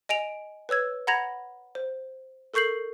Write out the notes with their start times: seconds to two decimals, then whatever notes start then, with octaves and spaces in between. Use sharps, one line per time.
0.09 D#5 G#5 D7 F7
0.69 B4 C#5 E6 G#6
1.07 F#5 A#5 B5 G#6 A#6 F7
1.75 C5
2.54 A4 A#4 C#6 G6 C7 F#7